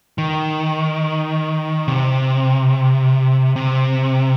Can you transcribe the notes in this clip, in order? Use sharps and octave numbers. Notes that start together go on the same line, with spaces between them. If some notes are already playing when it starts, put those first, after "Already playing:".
D#3
C3
C3